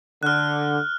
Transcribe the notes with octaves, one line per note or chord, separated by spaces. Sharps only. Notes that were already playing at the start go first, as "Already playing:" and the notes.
D3 F6 F#6